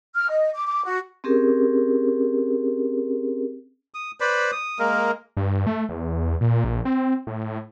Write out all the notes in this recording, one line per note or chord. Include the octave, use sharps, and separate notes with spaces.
F6
D#5
D6
D6
F#4
C4 C#4 G4 G#4 A#4
D#6
B4 C5 D5 B5
D#6
G#3 A#3 A#4
G2
A3
E2
A#2
A#1
C4
A2